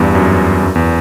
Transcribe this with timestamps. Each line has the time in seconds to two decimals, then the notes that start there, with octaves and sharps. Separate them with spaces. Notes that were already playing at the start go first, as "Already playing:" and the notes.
Already playing: E2 G2
0.15 F#2
0.63 F#2
0.75 E2